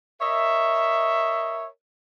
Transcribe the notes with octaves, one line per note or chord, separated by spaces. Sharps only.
A#4 C#5 D#5 E5